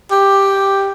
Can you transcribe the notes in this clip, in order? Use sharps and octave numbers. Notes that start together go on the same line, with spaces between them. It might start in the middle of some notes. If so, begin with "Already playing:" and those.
G4